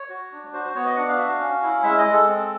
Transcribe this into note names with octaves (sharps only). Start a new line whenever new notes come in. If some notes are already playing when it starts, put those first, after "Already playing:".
Already playing: C#5
F#4
D4
F#4 C5
C5
B3 C#5
D#5
D4 F#5
F5
F#4 E5
F5
C#4
E4
G#3 E5
D#5
G#3
A4
C4